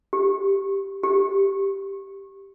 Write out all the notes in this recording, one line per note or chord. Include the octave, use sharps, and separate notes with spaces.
G4
G4